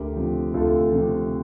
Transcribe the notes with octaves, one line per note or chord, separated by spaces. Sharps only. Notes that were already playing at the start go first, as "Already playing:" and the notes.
Already playing: D2 G4 A#4
C3 F3
D2 F4 A4
C3 F3